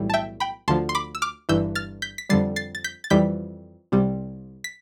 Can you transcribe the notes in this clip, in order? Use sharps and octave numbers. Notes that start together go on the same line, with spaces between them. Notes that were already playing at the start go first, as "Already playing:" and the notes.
Already playing: B1 A2 E3 G3
A5
E5 G5
G5 B5
D2 D3 F3 A5 C6
C6
B5 D6
E6
D6 F6
G1 G2 E3 E6 G6
F6 A6
G6 B6
B6
F2 D3 G3 A6 C7
A6 C7
A6
G6 B6
A6
F2 E3 G3 G6 B6
C2 C3 G3
B6